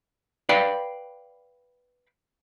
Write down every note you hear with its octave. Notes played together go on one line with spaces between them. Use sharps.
B4 D5 F5 G5 B5